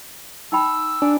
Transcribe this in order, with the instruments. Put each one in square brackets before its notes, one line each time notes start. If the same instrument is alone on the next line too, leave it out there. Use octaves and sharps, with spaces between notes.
[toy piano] D#4 G5 B5 [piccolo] E6
[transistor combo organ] D4 [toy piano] G#5